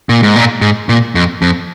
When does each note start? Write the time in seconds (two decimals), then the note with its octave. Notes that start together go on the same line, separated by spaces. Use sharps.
0.09 A#2
0.23 G#2
0.36 A#2
0.61 G#2
0.89 A#2
1.15 F2
1.42 F2